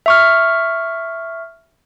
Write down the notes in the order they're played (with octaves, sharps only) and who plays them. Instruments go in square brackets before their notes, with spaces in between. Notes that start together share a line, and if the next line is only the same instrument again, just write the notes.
[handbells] E5 C#6 F6